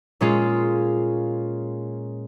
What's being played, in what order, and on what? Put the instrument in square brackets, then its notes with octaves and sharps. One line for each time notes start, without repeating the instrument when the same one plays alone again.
[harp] A#2 G#3 C#4 F4